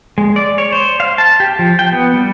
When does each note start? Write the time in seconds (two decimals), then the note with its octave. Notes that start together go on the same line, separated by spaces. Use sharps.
0.18 G#3
0.36 D5
0.58 C#5
0.72 C5
1.00 F5
1.18 A5
1.40 G4
1.59 F3
1.79 G5
1.92 B3
2.14 G3